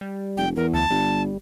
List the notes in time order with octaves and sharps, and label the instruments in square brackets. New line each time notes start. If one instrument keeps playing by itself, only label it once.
[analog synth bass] G3
[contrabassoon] F1 [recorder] G5
[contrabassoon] E2 [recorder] A#4
[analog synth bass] D2 [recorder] A5
[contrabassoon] G1 [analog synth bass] G3